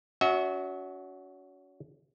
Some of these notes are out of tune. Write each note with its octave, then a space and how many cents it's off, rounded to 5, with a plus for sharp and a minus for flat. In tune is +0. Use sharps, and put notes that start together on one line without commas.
C#4 +35 F#4 +0 E5 -35